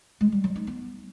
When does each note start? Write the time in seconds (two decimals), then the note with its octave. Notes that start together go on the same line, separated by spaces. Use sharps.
0.21 G#3
0.32 G3
0.44 F#3
0.56 D#4
0.67 B3